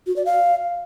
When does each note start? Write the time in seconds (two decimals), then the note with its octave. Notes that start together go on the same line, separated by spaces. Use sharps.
0.07 F#4
0.16 D5
0.26 F5